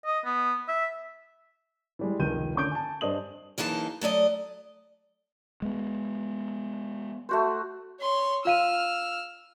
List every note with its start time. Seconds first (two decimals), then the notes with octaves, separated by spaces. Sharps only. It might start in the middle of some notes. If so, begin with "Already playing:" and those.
0.05 D#5
0.25 B3
0.68 E5
1.99 E3 G3 G#3
2.19 F1 C#2 D#3 G6 D#7
2.55 D3 A3 C#4 D6 G6 D7
2.71 G#5 A5
3.01 G2 D4 C5 D#5 D#6 F#7
3.58 F#2 E3 A#3 D#4 G#4 A5
4.01 F#3 A3 D5 D#5
5.62 G#3 B3
7.29 A3 F#4 C5
8.00 C#5 C6
8.45 F4 F5 E6 F6 D#7